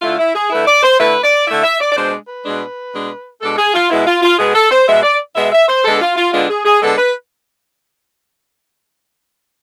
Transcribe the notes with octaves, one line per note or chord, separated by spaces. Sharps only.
D3 A3 E4 F4
E4
G#4
D3 A3 E4 B4
D5
C5
D3 A3 E4 B4
D5
D3 A3 E4 E5
E5
D5
D5
B2 G#3 D4 C5
B4
B2 G#3 D4
B2 G#3 D4
B2 G#3 D4 A4
G#4
F4
B2 G#3 B3 E4
F4
F4
B2 G#3 B3 G#4
A4
C5
B2 G#3 B3 E5
D5
B2 G#3 B3 E5
E5
C5
D3 G#3 B3 D4 A4
F4
F4
D3 G#3 B3 D4 F4
G#4
G#4
D3 G#3 B3 D4 A4
B4